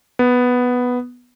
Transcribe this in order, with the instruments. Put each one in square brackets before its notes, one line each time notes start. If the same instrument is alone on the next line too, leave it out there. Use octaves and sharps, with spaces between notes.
[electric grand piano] B3